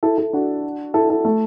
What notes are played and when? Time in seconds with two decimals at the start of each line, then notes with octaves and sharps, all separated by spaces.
0.03 E4 A4
0.18 E4 A4
0.33 D4 F#4
0.94 E4 A4
1.10 E4 A4
1.25 A3